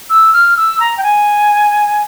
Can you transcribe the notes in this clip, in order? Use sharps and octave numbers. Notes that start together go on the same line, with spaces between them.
E6
F6
E6
A#5
G5
G#5